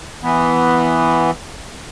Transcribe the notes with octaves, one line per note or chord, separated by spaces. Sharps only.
E3 B3